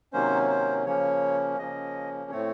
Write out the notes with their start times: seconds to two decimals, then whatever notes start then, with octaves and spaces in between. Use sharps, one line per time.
0.13 C3 D#3 F#3 A#3 C#4 C5
0.49 C5
0.86 C#3 F3 A#3 C#4 C#5
1.58 C#3 F3 A#3 C#4 D#5
2.31 A2 A3 C4 C#5